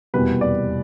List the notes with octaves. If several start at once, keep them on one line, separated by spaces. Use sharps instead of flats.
F1 E2 B2 G3 A#3 B4
D5